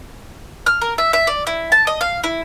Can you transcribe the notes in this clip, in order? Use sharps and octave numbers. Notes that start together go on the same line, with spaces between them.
F6
A#4
E5
E5
D5
E4
A5
D#5
F5
E4